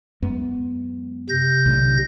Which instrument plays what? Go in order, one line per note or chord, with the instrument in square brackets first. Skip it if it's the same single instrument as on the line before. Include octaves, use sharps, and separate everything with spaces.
[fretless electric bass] F#2 G#3 B3
[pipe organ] C3 G6 A#6
[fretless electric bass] B1 A2 D3